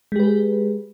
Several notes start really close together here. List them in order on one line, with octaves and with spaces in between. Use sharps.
G#3 G4 B4 G#4